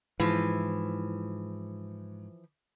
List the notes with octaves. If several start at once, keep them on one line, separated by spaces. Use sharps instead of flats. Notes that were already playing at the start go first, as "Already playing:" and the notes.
G#2 E3 F3